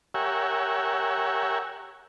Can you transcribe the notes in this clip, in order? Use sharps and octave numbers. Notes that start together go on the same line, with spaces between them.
G4 A#4 C#5 E5 F#5 G#5